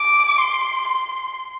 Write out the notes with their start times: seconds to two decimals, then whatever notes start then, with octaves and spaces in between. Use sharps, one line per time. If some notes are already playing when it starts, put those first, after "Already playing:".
Already playing: D6
0.38 C6
0.88 C6